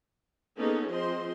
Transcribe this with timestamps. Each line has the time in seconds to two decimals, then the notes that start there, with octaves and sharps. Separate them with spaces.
0.58 A#3 B3 C#4 D#4 G#4 A4
0.90 F3 C4 G#4 C5 D#5 C6